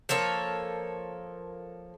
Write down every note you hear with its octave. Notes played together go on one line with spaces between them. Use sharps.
F3 A#3 A4 C#5